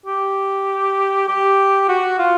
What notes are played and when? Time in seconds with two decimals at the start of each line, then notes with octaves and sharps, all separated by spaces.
0.06 G4
1.28 G4
1.89 F#4
2.19 F4